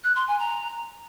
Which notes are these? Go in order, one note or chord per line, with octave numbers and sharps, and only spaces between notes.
F#6
C6
G#5
A#5